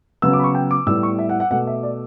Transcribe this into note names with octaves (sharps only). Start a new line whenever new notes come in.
C#3 F#3 B3 E6
D6
B5
C#6
G5
D6
A2 G3 B3 E6
C#6
E5
F#5
F#5
B2 A3 F#5
E5
D5